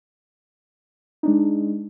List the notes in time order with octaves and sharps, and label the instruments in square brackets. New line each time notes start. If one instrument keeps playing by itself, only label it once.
[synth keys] G#3 D4 D#4